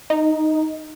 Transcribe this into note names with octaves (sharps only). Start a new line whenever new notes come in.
D#4